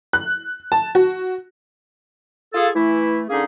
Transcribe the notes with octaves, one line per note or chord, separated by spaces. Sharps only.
F#6
A5
F#4
F4 G#4 A4
E3 A3 E4
D3 A#3 C#4 D#4 G#4